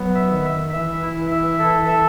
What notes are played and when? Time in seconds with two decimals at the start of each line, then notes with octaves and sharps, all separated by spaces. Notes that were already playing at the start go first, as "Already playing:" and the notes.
Already playing: F#3 B3
0.15 E5
0.30 D#3
0.44 E5
0.73 E3 E5
1.02 E4
1.31 E5
1.59 A4
1.88 E5